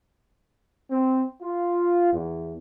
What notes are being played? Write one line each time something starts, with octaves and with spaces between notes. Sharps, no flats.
C4
F4
E2